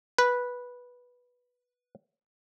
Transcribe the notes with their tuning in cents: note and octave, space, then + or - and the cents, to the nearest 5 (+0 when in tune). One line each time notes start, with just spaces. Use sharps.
B4 -10